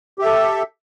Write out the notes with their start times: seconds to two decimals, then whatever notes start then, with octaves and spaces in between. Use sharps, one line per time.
0.19 G4
0.22 E5
0.25 A4